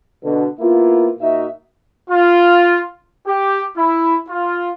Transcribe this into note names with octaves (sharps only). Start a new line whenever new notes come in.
B2 D3
A#3 B3 E4 F4
A#2 D#4 F#4 E5
F4
G4
E4
F4